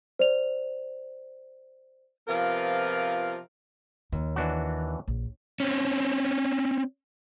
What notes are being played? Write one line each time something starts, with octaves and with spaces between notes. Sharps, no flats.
C5 D5 F7
C3 F3 B3 F4 A#4 F5
D#2 D#3
E3 D4 F#4
A#1
C4 C#4